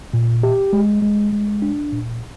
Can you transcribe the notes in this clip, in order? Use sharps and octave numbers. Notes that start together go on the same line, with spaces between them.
A#2
G4
G#3
G#3
G#3
D4
A#2